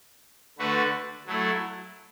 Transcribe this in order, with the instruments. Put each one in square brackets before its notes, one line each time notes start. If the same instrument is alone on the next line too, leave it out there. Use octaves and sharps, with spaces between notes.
[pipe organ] D3 A3 F#4 B4
F#3 A3 E4